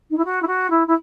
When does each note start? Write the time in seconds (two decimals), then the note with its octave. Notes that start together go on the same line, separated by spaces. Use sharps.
0.10 D#4
0.17 E4
0.24 F#4
0.42 E4
0.47 F#4
0.70 E4
0.87 E4